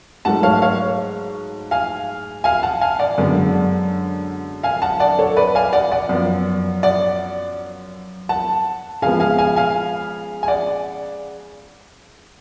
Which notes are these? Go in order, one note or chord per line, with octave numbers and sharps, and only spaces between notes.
G#2 F#3 A3 F#5 A5
C#5 F5
C#5 F5
F5 G#5
F5 G#5
F#5 A5
F5 G#5
D5 F#5
F#2 D3 G#3 B3
F5 G#5
F#5 A5
D5 F#5
A4 C#5
B4 D5
F5 G#5
D5 F#5
D5 F#5
F#2 F3 B3
D5 F#5
F#5 A5
C#3 F3 G#3 B3 F5 G#5
F5 G#5
F5 G#5
F5 G#5
G#5
D5 F#5